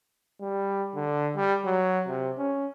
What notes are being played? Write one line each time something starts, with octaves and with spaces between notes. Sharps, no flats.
G3
D3
G3
F#3
C3
C#4